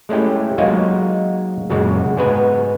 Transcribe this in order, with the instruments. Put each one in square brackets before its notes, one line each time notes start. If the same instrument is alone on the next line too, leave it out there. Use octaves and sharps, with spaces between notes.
[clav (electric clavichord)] G#3 A3 C#4 E4 G4
F#3 G#3 A#3 D#4 F4 F#4
F#2 A#2 C#3 G#3 F#4
G#2 G#3 B3 F#4 B4 G#5